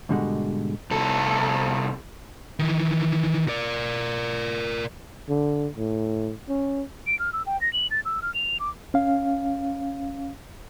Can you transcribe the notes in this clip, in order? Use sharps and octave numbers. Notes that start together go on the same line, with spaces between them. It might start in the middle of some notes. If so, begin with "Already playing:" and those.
G#2 B2 D3 G3 G#3 F#4
C2 A4
D#3 E3
A#4 D5
D3
A2
C#4
D7
F6
E6
G5
A#6
F#7
A6
E6
F6
F7
D6
C#4 F5